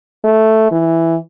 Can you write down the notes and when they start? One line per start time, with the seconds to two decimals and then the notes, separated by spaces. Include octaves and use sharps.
0.24 A3
0.71 E3